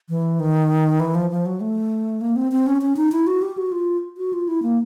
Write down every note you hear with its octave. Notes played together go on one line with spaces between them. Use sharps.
E3
D#3
E3
F3
F3
F#3
A3
A#3
C4
C4
C#4
C#4
D#4
E4
F#4
G4
F#4
F4
F#4
F4
E4
A#3